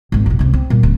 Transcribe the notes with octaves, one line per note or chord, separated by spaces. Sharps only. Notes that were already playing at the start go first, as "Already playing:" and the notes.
G#1 G#2
F2 B2
C#2 C3
C4
A#2 G3
D1